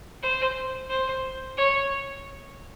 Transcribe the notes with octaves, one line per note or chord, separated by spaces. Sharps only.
C5
C5
C#5